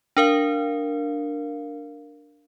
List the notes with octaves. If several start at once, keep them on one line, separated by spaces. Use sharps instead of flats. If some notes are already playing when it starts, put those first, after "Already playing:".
D4 A#4 F5